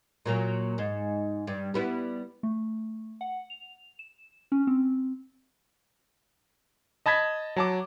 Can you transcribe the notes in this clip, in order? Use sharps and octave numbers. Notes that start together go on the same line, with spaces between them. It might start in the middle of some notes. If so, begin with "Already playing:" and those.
A#2 F#3 A#3
G#2
G2
G3 B3 E4
A3
F#5
F7
E7
C#4
C4
D#5 A5 B5 G#6 B6
F#3 A5 D6